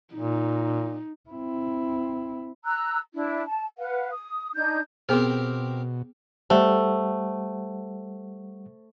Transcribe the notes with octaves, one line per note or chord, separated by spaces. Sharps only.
A#2 D#4
C4 E4
A#5 E6 F#6
D4 E4
A5
B4 F5 F#5
D#6
D4 D#4 G6
B2 B3 C4 G4 G#4 A#4 C5
G3 A3 C5 F#5